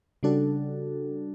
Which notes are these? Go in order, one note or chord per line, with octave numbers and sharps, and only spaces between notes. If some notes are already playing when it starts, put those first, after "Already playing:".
C#3 G3 D4 F#4 A4